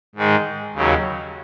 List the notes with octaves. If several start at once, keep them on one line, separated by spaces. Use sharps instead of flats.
G#2 D#3 G#3
D#2 C#3 F#3